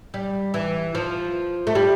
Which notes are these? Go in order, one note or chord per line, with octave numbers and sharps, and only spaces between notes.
G3
E3
F3
A3
G3